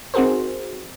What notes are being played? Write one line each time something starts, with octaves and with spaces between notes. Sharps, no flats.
C4 D#4 F#4 G#4 A#4 C5